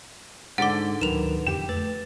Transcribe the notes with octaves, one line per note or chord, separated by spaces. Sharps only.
G#2 D3 F#5 D6 A6 D7
D1 D#3 F#3 A#4 B4 E7 F7
F2 D3 G4 G5 E7
A3 B4 A6